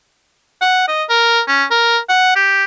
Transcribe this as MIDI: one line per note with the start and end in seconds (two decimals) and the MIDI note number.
0.61 0.84 78
0.88 1.03 75
1.09 1.41 70
1.47 1.64 61
1.70 1.98 70
2.09 2.31 78
2.36 2.65 67